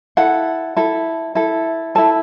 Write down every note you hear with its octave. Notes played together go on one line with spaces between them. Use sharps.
E4 A4 F#5
E4 A4
E4 A4
E4 A4 A5